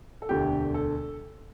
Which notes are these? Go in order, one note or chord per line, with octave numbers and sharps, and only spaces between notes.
A4
E1 D2 D3 A3 G4
A4